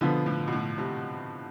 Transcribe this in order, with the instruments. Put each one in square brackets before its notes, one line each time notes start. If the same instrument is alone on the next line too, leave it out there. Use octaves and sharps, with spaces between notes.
[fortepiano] B2 [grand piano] D3 F3 B3
[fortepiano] A2
B2
A2
A2 C3